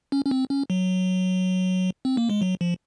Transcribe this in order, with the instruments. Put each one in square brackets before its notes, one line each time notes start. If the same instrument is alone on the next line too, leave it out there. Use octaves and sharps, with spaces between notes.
[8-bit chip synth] C#4
C#4
C4
C#4
F#3
C4
A#3
G#3
F#3
F3